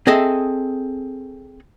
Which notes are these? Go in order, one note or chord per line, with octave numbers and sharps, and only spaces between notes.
C4 G#4 A4 D#5 E5